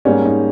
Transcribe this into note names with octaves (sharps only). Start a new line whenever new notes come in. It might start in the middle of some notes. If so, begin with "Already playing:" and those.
G#2 G3 A#3 C#4
D#4